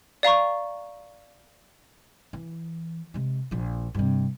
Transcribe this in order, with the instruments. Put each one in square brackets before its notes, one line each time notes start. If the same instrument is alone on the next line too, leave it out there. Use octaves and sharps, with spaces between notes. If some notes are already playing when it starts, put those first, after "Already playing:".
[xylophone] D5 F5 A#5 C#6
[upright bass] E3
C3 G#3
A#1 F3
G2 C3